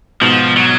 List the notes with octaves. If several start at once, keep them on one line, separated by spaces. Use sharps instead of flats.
G#2 B2 F3
F#3